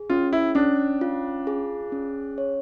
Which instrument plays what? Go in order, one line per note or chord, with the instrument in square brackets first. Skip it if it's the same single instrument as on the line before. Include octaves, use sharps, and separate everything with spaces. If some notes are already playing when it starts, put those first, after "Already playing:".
Already playing: [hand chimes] G#4
[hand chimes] C#4 [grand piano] F4
[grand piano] E4
[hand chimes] C#4 [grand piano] D4
[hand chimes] F4
G#4
C#4
C#5